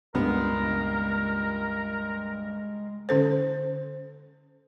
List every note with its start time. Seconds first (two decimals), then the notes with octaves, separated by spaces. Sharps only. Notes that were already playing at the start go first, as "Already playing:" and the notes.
0.15 C#2 G2 A#2 G#3 B3 A#4
3.09 D3 C#4 A4 C5